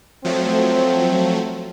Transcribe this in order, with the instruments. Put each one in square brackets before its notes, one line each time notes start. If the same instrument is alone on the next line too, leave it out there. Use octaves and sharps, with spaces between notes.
[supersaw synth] F3 F#3 A3 [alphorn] C4